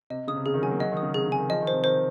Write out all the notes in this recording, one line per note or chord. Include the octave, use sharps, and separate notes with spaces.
C3 D#5
C#3 D#6
C3
C#3 G#4
D#3
F#3 G#5
A#3
F#3 D#5
D#3
D#6
C#3
C3 G#4
C#3
G#5
D#3
F3 D#5
D#3
C5
C3
D#3 C5